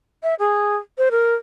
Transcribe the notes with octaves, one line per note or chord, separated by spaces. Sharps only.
E5
G#4
C5
A#4